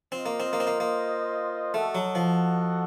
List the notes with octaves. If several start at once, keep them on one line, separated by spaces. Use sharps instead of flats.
C4 F4 C5 D#5
A#3
C4
A#3
C4
A#3
A#3
A3 F#4 A4 D#5 F#5
F#3
F3